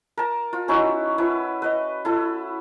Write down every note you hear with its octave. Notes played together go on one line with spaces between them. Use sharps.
A#4 A5
F4
C#4 D#4 E4 F#4
E4 B4 E5
B4 D#5
E4 A4